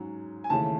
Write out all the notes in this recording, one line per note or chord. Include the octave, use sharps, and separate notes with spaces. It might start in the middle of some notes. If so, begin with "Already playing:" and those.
Already playing: G#2 F#3 C#4
G#5
D#2 C#3 E3 A3 A5